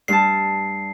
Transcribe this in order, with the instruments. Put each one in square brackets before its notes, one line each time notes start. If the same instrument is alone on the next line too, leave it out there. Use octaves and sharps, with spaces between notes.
[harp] G2 A5 [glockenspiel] C7